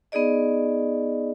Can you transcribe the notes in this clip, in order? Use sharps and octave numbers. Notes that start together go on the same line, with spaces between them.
B3 D#4 G#4 D5 D#5